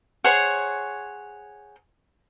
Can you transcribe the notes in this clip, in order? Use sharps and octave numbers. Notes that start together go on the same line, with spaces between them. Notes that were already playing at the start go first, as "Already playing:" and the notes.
G#4 C5 C#5 F#5